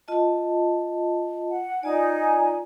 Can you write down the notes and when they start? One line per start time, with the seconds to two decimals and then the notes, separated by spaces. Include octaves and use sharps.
0.08 F4 D#5 A5
1.50 F#5
1.83 D#4 F4 D5 G#5